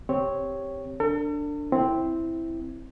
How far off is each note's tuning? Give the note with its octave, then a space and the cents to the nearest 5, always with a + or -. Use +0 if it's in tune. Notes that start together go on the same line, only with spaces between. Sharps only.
C4 +0 G4 +0 C#5 +0
D4 +0 A4 +40
C4 +0 E4 +0